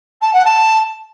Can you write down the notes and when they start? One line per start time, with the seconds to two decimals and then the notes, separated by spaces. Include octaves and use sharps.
0.21 A5
0.33 F#5
0.45 A5